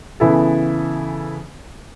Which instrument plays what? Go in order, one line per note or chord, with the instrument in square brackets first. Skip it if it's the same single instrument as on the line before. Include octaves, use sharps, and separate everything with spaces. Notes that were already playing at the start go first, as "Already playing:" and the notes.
[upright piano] C#3 E3 B3 E4 A4